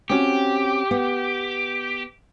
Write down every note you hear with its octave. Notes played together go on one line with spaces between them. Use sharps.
C4 C#4 F#4 G4
B3 F#5